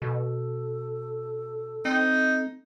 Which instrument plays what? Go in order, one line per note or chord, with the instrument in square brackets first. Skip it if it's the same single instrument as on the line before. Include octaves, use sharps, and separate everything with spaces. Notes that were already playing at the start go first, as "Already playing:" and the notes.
[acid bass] B2 [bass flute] A4
[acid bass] C4 [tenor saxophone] D#4